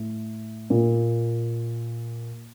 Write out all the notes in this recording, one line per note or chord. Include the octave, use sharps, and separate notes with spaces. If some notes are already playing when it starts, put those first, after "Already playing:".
Already playing: A2
A#2